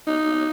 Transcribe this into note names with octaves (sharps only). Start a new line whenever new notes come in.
D#4